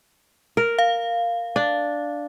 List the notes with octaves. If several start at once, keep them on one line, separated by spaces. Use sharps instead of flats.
A#4
F5
D4